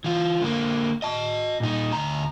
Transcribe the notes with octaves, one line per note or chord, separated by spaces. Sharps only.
E3 F4
D3 A#3
D#5 A5
A#2 D#4
D2 A#5